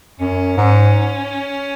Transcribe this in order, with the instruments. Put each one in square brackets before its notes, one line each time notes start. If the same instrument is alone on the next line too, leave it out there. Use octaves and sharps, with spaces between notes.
[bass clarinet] F#2 [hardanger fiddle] C#4
[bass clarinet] G#2